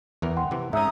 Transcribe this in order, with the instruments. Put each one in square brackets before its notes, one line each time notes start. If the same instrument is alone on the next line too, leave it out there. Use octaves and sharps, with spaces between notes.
[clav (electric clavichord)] E2 E3 A#4
[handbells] F#5 G5 C6
[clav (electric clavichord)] C3 E3
[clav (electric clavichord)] G#2 C#4 [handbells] E5 E6 G6 [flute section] A#5 D#6